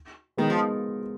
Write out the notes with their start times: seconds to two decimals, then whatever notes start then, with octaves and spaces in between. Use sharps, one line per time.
0.37 D#3 G#3 B3
0.50 F3